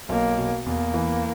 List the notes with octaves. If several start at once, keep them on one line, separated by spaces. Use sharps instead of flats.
B1 A#3
B2
E2 A#3
E3